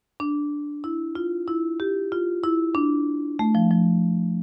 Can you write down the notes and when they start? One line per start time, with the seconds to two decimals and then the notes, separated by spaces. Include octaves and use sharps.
0.20 D4
0.84 E4
1.15 F4
1.48 E4
1.80 G4
2.12 F4
2.43 E4
2.75 D4
3.39 A3
3.55 F3
3.71 F3